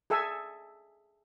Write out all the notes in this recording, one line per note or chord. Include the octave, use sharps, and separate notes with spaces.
G#4 A4 E5 G#5 E6